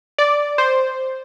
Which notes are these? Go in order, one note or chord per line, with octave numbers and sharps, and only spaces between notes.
D5
C5